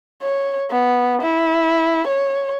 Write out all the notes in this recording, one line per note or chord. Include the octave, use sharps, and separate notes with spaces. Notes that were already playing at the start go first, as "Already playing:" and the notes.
C#5
B3
E4
C#5